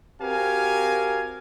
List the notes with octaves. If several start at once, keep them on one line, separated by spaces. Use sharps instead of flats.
C4 F#4 G4 A#4 F5 G#5